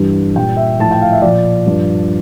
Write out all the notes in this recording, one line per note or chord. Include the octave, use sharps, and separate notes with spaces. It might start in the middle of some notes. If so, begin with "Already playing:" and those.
Already playing: G2 E3 G3
A#2 G3 G5
E5
A2 F3 A5
G5
F5
E5
A#2 F3 D5
G2 F3